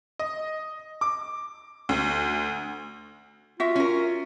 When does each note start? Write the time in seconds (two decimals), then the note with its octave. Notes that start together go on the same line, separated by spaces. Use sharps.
0.19 D#5
1.01 D6
1.89 D2
3.60 F4 F#4 E5
3.75 C#4 A#4